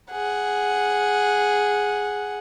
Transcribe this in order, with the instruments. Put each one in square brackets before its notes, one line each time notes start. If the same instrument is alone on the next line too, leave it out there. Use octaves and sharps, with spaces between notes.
[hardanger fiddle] G#4 F#5